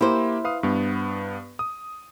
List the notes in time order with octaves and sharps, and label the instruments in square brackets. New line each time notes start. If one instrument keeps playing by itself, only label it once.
[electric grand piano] A#3 G4 [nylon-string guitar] E4 C5
[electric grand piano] B4 F5 D#6
G2 B3
D#6